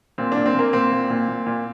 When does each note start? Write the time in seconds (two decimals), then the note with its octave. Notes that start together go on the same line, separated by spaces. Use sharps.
0.18 A#2 C4
0.32 A#2 D4
0.46 C4
0.54 A#2 A#3
0.73 A#2 C4
0.92 A#2
1.10 A#2
1.28 A#2
1.46 A#2